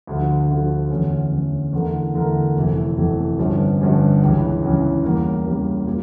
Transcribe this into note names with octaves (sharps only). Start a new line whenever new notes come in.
D2 D3 F3
D2 D3 F3
E2 D3 A3 C#4
E2 D3 A3 C#4
E2 D3 A3 E4 A#4
E2 D3 A3 E4 A#4
F1 F2 E3 A3
F1 F2 E3 A3
G1 G2 F3 C#4
G1 G2 F3 C#4
C#2 C#3 E3
C#2 C#3 E3
E2 C#3 G3 A#3
E2 C#3 G3 A#3
A#2